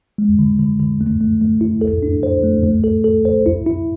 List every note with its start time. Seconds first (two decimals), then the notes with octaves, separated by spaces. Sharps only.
0.18 G#3
0.39 D3
0.59 D3
0.80 D3
1.01 A3
1.21 A3
1.41 A3
1.61 E4
1.81 A4
2.03 D4
2.23 C5
2.43 A3
2.64 A3
2.84 A4
3.04 A4
3.25 C5
3.46 E4
3.66 E4